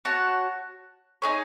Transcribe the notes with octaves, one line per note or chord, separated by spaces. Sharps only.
F#4 C#5 F#5 A5
D#4 G#4 C#5